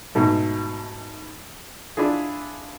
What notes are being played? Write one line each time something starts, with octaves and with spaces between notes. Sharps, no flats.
G#2 B2 A3
D4 E4 F4 G#4